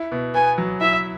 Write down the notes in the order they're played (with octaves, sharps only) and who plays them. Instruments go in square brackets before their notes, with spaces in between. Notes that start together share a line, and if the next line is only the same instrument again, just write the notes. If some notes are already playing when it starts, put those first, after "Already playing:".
Already playing: [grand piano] E4
B2
[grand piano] B3 [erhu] G#5
[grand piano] F#3
[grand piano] E4 [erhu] E5